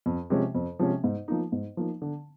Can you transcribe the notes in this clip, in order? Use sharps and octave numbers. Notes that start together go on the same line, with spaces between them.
F2
C3 F3 G#3 C#4
F2
C3 F3 G#3 C#4
G#2
F3 A#3 D#4
G#2
F3 A#3 D#4
D3